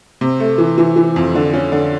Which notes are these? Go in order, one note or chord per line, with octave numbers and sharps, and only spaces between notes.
C3
A3
E3
E3
E3
F2
D3
C#4
D3